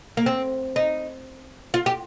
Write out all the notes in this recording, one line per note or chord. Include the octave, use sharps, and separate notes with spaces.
A#3
C4
D#4
F4
G4